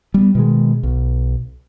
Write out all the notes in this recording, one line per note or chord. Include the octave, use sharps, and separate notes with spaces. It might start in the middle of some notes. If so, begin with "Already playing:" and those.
G3 B3
B2 D#3 G#3
B1